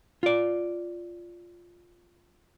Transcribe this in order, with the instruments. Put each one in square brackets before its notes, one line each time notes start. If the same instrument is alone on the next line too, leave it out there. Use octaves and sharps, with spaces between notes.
[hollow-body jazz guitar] F4 D5